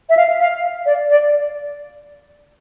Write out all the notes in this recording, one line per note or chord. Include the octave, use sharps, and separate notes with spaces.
E5
F5
F5
D5
D5